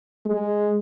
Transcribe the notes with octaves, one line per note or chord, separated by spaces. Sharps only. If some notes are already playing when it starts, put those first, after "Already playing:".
G#3